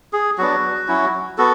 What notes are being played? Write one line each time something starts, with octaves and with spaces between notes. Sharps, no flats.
G#4
F#3 B3 D4 F#4
F#3 C#4 E4
B3 F#4 A4